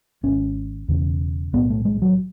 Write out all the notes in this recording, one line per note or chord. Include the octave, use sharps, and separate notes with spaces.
G#1 G#2 C#4
E1 E2 C#3
B1 A2 B3
A3
G#3
F#3